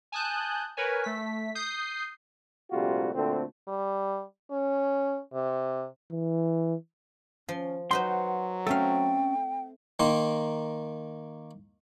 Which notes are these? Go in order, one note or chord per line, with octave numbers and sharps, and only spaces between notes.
G#5 A5 D#6 F#6 G6
A#4 B4 C#5 G#5
A3 B6
D#6 G6 C7
A#1 C3 G3 A3 F4 F#4
D2 A#2 D3 A3 C4
G3
C#4
C3
E3
F3 C#4 C6
F#3 D#4 B4 C5 F#5 C6
A3 C4 C#4 A4 F5 G5
D#3 A#3 C6